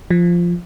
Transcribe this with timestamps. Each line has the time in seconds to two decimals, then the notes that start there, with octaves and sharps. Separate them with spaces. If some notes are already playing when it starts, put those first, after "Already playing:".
0.10 F3